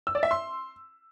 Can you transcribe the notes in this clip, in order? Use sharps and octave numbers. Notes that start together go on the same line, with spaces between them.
E6
D5
E5
C6